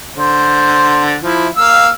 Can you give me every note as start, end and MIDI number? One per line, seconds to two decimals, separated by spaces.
0.16 1.16 50
0.16 1.16 72
1.22 1.47 53
1.22 1.47 64
1.57 1.88 58
1.57 1.88 77
1.57 1.88 88